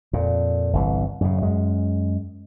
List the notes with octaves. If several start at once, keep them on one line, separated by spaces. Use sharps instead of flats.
F2 A#2
G1 C2 E3
F#2 C#3
F#2 G#3